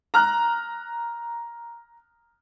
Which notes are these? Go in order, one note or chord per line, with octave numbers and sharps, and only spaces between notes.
A#5 F6 F#6